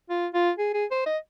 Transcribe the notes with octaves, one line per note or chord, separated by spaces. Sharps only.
F4
F4
G#4
G#4
C5
D#5